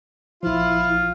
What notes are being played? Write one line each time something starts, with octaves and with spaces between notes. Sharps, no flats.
A#1 F3 E4 F4